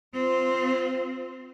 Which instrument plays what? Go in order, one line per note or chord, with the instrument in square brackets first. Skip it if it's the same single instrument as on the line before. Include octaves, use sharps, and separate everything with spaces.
[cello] C4 F4